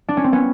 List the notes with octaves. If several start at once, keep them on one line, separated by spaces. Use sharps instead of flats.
D4
C#4
C4
B3 C#4